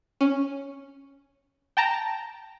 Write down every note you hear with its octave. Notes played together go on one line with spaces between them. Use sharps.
C#4
G5 A5 A#5